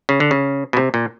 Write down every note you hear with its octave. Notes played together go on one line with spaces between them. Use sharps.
C#3
D3
C#3
B2
C3
A#2